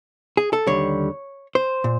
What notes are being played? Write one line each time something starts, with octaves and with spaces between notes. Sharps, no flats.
G#4
A4
D#2 D3 G3 C#5
C5
A#2